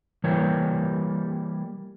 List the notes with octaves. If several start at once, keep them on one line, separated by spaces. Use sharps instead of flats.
E3 G3 A#3 G4 C#5